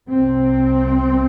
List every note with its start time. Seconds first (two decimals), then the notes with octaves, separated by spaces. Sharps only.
0.10 C2 C3 C4